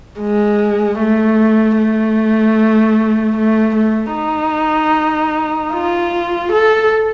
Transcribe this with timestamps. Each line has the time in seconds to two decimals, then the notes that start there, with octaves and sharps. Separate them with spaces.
0.20 G#3
0.99 A3
1.78 A3
3.36 A3
3.75 A3
4.14 D#4
5.73 F4
6.52 A4